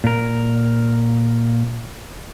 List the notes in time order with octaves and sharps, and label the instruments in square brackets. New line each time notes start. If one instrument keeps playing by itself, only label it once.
[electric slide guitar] A#2 A#4